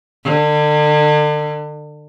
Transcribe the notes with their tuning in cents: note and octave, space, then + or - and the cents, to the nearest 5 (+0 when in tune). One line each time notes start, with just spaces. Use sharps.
D3 +35